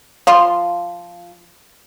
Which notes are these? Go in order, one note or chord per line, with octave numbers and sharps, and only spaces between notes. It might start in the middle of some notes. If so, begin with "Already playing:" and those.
F3 F4 C6